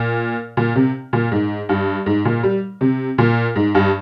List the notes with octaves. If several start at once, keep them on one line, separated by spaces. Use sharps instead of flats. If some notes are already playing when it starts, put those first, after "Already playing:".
Already playing: A#2
A#2
C3
A#2
G#2
G2
G#2
A#2
G3
C3
A#2
G#2
G2